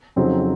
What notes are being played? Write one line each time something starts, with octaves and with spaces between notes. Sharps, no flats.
F2 C#3 F#3 C4 D#4